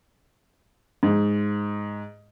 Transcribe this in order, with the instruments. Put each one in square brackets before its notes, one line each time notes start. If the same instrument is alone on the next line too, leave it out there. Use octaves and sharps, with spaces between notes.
[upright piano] G#2